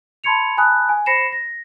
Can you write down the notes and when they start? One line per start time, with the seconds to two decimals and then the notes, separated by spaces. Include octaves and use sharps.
0.24 A5 B5 C6 G#6 C#7 F7
0.57 G#5 A5 B5 D#6 F#6
0.89 G#5
1.06 C5 B5 A#6 C7 C#7 E7
1.32 A#6